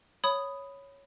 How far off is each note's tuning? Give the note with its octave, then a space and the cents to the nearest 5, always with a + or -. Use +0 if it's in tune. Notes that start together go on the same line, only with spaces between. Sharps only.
C#5 +0 B5 +10 D#6 +0